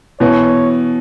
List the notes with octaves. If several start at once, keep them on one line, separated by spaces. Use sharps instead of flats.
B2 E3 C#5